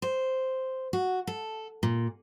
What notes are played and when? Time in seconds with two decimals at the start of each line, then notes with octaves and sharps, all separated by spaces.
0.02 C5
0.93 F#4
1.27 A4
1.83 A#2